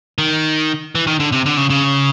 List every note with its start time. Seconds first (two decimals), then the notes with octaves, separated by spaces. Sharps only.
0.18 D#3
0.95 E3
1.07 D#3
1.20 D3
1.32 C3
1.46 D3
1.57 C#3
1.70 C#3